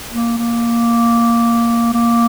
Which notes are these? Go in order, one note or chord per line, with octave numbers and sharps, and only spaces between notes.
A#3
A#3
A#3